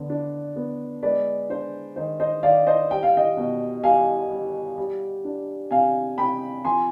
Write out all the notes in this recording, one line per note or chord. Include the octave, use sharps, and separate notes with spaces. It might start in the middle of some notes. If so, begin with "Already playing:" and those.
Already playing: D3 B3
D4
B3
G#3 B4 D5
D4 C5
D#3 C5
C5 D#5
D#3 D5 F5
C5 D#5
G3 G5
F5
D#5 G5
B2
G3 F5 G#5
G3
G3
D4
C3 F5 G#5
C3 G5 B5
F3 G#5 C6